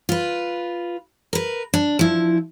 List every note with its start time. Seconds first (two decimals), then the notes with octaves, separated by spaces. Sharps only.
0.09 F4 B4
1.33 A#4 B4
1.74 D4
1.99 F3 E4